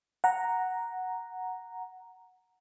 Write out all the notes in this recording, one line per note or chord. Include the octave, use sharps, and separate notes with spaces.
F#5 A#5